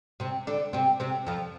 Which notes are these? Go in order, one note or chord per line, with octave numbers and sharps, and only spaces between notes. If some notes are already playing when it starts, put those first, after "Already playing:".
C3 C4
D3 D4
C3 C4
C3 C4
F2 F3